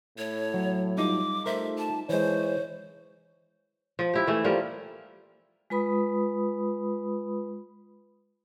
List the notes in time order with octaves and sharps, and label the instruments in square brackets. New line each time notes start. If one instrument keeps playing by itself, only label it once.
[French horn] A2 [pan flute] C#5
[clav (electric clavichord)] F#3
[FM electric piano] G3 D#4 F4 [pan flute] D6
[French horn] A3 [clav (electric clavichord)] A#4 C5 [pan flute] E5
[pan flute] A5
[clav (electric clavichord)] E3 G#3 [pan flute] C5 [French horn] C#5
[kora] F3
E4 G4
E3 A3
F3 G3 A#3
[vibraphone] G#3 F4 B4 B5 D#6